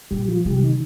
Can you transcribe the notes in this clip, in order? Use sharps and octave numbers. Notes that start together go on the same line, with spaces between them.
A#2 G3
F3
C3 G3
D#3